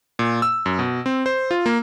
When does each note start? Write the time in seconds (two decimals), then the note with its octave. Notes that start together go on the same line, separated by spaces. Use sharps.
0.19 A#2
0.42 E6
0.66 F#2
0.79 B2
1.06 C4
1.26 C5
1.51 F4
1.66 A#3